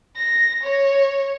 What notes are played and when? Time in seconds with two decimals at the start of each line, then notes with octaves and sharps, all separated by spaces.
0.17 A#6
0.64 C#5